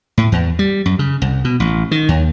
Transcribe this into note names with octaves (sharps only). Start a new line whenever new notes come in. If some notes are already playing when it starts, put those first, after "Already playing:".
A2
E2
G3
F#2
C#3
C2
B2
A1
D#3
D#2